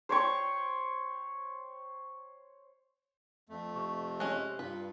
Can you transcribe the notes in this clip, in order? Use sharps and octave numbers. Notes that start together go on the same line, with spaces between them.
C5 C#5 G5 C#6
F2 A3
C3 C#6
G#3 C#4 F#6
G2 F4 B4